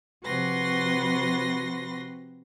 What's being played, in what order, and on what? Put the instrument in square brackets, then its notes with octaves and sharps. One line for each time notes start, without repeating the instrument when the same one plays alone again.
[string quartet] C3 F3 F#4 B4 C6 A#6